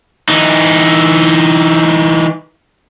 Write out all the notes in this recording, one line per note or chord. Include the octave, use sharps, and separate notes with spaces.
E3 D#4